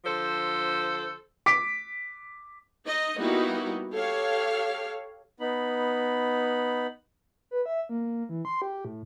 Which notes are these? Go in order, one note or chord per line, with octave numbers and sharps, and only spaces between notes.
D3 F3 A4 C5
D6 B6 D7
D#4 D#5
G3 A#3 B3 D#4 E4 F#4
G4 A4 C#5 F5
B3 D#4 B5
B4
E5
A#3
E3
C6
G4
A2